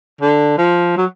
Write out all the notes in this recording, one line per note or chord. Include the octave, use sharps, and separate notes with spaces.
D3
F3
F#3